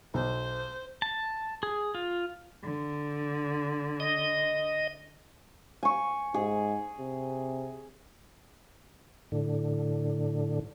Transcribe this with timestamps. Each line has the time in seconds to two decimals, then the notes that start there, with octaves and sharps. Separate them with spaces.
0.14 B1 C5
1.02 A5
1.63 G#4
1.95 F4
2.64 D3
4.00 D#5
5.83 G#5 C#6
6.34 G#2 G#4
7.00 C3
9.32 A2 D3